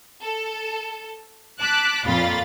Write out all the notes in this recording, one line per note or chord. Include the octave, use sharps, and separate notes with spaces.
A4
A5 D6 F#6 B6
F2 A#2 F4 B5 A6